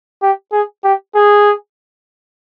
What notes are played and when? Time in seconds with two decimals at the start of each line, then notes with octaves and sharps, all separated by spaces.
0.22 G4
0.52 G#4
0.84 G4
1.15 G#4